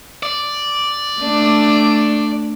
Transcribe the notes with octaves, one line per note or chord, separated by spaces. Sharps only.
D5
A3 D4